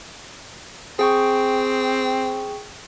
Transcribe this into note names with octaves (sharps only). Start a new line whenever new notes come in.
C4 G#4 G5 C#6